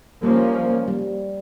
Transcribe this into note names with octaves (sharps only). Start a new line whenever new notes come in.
F3 G3 A#3 C#4
G3